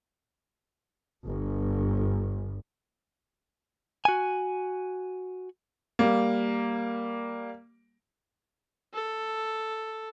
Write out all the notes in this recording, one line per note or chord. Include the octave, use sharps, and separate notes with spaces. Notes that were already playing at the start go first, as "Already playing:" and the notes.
G1
F#4 G#5
G3 A#3
A4